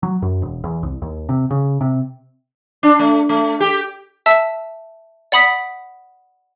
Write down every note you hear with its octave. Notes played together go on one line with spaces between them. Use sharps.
F#3
F#2
E1
E2
C2
D#2
C3
C#3
C3
D4
A3
A3
G4
E5 A5 E6
D5 F#5 B5 D#6 B6